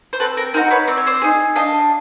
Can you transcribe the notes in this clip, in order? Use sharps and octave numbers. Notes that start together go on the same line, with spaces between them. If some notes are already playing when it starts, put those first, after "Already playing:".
C5
C4 A4 B4
A#4
D#4 F#4 A#4 C5
B4 C#5
C4 D5
C#5
C5 D5
D#4 G#4
D4 D#5 F5